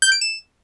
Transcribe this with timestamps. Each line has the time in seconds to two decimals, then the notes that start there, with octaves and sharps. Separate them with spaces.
0.02 G6
0.12 D7
0.21 E7